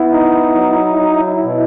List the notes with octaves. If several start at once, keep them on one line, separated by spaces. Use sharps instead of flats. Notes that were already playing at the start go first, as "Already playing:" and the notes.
Already playing: B3 E4
D#4
F#3
F#3
B2